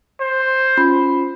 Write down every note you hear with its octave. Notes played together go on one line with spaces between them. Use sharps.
C5
C#4 F4 B5